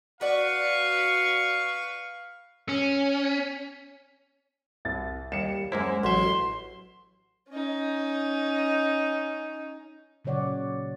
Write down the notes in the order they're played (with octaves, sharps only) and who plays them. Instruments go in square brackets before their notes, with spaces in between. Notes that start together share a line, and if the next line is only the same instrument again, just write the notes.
[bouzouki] F#4 D5 F#5 [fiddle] B4 C#6 [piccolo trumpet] F5
[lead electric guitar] C#4
[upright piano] C2 A6
[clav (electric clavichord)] D#2 [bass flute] G3 [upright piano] C#7 E7
[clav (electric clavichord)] F#2 A#3 E4 [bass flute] G#3 [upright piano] C5
[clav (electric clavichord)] A1 E5 [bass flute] F#3 [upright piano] F#4 [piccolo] C6
[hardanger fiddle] C#4 D#4
[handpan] A#2 C#3 F#3 C#5 D5 F#5